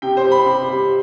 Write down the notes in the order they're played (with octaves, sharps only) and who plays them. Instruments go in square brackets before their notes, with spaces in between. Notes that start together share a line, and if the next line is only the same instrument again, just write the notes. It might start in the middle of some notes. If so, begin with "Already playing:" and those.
[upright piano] C3 G5
C5
G3
B5
C3 B5
G3